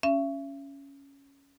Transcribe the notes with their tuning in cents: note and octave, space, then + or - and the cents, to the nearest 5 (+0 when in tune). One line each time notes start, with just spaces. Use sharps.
C#4 +0 E5 +40